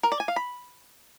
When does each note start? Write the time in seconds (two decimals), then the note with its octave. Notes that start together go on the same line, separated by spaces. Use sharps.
0.03 A#4
0.12 D5
0.20 G#5
0.28 F5
0.36 B5